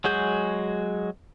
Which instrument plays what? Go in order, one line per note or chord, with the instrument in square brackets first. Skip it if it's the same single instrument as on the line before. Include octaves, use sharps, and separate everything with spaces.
[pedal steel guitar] F#3 G#3 F#4 G#4 G6